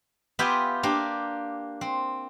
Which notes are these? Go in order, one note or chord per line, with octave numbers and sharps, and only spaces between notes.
B3 F4 G4 E5 G5 G#5
A#3 D4 G4
C4